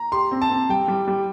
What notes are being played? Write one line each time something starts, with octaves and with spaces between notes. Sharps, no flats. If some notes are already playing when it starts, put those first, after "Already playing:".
Already playing: A#5
G4 C6
C4
A5
C4
G3 G5
G3
G3